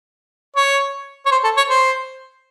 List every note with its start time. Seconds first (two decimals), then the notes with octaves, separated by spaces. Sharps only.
0.56 C#5
1.26 C#5
1.32 C5
1.44 A4
1.57 C#5
1.69 C5